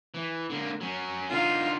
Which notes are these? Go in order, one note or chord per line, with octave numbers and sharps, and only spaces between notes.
E3
D3 A#3
F#3 C#4
D3 D#4 F4